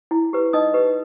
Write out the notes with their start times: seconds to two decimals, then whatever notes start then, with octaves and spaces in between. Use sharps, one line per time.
0.11 E4
0.33 G4 B4
0.53 D#4 D#5 D#6
0.74 G4 B4